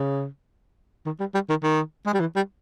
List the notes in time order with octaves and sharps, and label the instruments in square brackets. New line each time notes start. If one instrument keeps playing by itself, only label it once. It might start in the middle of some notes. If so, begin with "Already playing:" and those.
Already playing: [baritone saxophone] C#3
D#3
G3
G3
D#3
D#3
G#3
G3
E3
G3